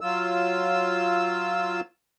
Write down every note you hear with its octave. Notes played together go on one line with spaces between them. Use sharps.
F#3 F4 E6